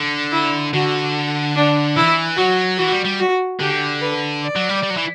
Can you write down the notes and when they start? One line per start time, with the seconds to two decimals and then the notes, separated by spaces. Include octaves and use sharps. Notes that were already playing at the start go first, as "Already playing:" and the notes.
Already playing: D3
0.32 E4
0.73 D3 F#4
1.56 D4
1.96 E3 E4
2.37 F#3 F#4
2.77 E3 F#4
2.92 G3
3.05 G3
3.19 F#4
3.60 D3 G4
4.01 B4
4.42 D5
4.56 F#3
4.69 G3
4.83 G3
4.90 F#3
4.97 E3